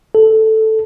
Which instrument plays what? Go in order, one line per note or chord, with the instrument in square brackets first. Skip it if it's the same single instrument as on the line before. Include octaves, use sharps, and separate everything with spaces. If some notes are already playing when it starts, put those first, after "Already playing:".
[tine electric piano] A4